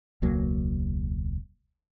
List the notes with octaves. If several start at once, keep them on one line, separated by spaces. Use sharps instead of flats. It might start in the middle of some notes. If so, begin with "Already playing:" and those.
E1 C#2 F#3 A#3